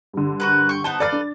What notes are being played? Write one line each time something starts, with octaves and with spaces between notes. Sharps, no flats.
G2 D3
F#4 A#4 B4
G5 C#6
B3 D#4 C5 A5
A4 B4 D5 F5 A6
D4